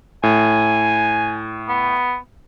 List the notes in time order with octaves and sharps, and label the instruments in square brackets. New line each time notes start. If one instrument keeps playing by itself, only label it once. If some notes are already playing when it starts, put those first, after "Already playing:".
[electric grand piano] A2 [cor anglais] G#5
[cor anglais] B3